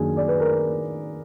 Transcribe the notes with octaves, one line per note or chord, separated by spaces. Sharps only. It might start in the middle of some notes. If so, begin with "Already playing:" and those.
Already playing: F#2 D#3 A#3 D4 G#4
D5
B4
A#4